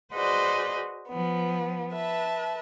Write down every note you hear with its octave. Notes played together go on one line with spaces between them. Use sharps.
F#4 G#4 B4 C5 D5 D#5
F3 B3
B4 E5 A5